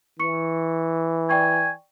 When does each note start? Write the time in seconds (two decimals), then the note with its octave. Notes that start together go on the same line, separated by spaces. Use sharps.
0.20 E3 C#6 C#7
1.29 D5 G5 G#5 C#6